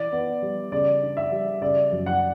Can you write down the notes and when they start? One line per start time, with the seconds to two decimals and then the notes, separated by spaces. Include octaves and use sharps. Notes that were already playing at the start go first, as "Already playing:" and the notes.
Already playing: E3 D5
0.12 B3
0.42 G3
0.72 C#3 D5
1.02 D4
1.17 E5
1.32 G3
1.62 C#3 D5
1.92 F#2
2.06 F#5